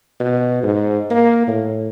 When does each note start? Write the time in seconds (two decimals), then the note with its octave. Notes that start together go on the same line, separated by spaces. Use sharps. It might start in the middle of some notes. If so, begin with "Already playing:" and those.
0.20 B2
0.63 G#2
1.10 A#3
1.47 A2